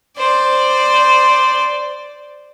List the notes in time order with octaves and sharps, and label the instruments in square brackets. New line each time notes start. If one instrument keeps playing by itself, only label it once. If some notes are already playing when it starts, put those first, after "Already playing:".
[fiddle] C5 D5